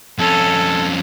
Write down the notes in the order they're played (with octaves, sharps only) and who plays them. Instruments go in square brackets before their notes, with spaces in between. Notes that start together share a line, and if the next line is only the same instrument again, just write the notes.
[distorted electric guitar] F2 C#4 [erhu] A4